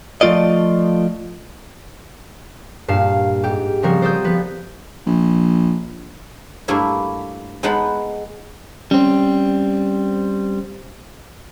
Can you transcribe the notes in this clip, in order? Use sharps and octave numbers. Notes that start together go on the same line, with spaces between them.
F3 A3 F4 D5 D#5
G2 A#2 F5 C7 E7
G#2 G4
C#3 F3 G3 C4 F#4 A#4
C5 D5 D#6 E6 G6
F3 B3 B4
A#1
G2 A3 A#3 E4 E5
G#3 B3 D#4 F#5 A5 B5
G3 C4 C#4